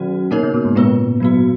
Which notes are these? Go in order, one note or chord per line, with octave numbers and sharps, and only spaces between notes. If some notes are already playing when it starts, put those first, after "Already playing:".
Already playing: B2 D#3 F#3 C#4 F#4
B2 A#3 D#4 A#4 C#5
C#3
B2
G#2
A#2 G#3 B3 F4 B4
F#3 B3 F#4